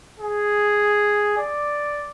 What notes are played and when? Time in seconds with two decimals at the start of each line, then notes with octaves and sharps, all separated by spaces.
0.20 G#4
1.38 D5